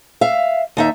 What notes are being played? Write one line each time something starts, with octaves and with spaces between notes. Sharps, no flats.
E5 F5
D#2 D#4 E5